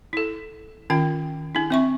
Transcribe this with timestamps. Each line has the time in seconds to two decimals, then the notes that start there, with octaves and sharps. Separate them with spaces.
0.13 E4 A4
0.90 D#3 C#4 F4 G5
1.55 D4 E4
1.70 C4 E5 C#6